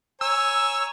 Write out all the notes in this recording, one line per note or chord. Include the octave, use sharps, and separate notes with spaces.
C#5 G#5 A#5 E6